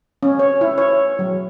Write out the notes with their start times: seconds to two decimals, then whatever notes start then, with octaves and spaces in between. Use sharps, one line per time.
0.23 C#4
0.39 C#5
0.61 E4
0.78 C#5
1.19 F#3